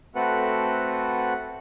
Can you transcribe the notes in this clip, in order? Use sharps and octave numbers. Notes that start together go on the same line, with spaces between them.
A3 C4 F#4 A4 B4 F#5